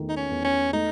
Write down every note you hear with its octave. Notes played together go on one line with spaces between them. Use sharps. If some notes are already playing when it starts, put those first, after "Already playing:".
Already playing: E2 D#3 A3
D#4
C#4
E2
C#4
A3 D#4